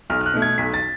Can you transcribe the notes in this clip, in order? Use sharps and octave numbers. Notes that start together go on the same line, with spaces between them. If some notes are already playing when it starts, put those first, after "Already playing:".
B1 F6
F6
F#6
B2 A3
G#6
B1 B6
A6